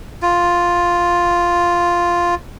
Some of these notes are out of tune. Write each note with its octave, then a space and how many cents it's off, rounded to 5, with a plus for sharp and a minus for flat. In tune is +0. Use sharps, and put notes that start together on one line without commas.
F4 +0